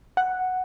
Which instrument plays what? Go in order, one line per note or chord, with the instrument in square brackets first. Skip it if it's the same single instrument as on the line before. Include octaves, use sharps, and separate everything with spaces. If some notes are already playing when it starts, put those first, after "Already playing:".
[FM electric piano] F#5